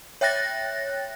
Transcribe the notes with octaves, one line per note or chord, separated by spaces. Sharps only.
C#5 E5 G5 F#6 A6 A#6